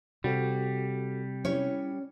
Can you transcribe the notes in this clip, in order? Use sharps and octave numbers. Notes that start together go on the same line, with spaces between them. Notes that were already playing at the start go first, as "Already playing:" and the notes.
C3 G3 F#4 A4
C#4 E4 G4 C#5